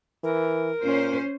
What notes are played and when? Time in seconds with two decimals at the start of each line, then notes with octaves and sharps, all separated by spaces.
0.23 E3 A#4
0.82 A#2 C#4 C5